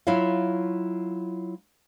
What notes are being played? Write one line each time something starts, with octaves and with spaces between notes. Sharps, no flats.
F#3 E4 F4 C#5 E5 F5